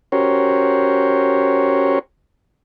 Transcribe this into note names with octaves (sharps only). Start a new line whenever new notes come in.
C#4 F#4 G4 A#4 C5 C#5